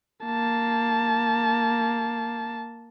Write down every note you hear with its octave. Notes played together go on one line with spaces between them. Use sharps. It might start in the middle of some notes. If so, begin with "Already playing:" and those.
A#3 A5